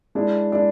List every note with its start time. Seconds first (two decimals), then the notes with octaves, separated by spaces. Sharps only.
0.15 G#3 D4 E4
0.52 G#3 D4 E4